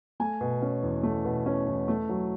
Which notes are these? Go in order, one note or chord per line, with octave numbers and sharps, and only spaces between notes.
A3 G#5
B2
C#4
E2
A3
B2
C#4
E2
A3
F#3